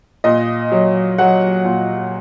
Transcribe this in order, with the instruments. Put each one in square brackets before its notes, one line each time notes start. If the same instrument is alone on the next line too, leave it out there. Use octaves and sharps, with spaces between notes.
[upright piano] A#2 D#5
F#3
F#3 F#5
A#2